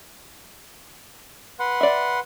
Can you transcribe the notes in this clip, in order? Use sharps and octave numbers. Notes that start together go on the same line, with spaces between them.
B4 F#5 C6
D5 E5